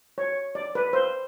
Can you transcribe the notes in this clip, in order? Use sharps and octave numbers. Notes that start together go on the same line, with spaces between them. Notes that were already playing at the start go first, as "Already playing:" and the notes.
C#5
D5
B4
C5